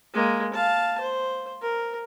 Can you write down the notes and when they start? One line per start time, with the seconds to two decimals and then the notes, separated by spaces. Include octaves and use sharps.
0.14 G#3 A#3
0.53 F5 A5
1.00 C5
1.62 A#4